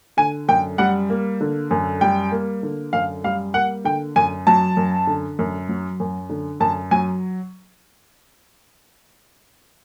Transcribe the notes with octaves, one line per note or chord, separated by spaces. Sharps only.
D3 G#5
F#2 G5
G3 F#5
A#3
D3
F#2
G3 G5
A#3
D3
F#2 F5
G3 F5
A#3 F#5
D3 G5
F#2 G#5
F#3 A5
F#2
D3
F#2
F#3
F#2
D3
F#2 A5
F#3 G#5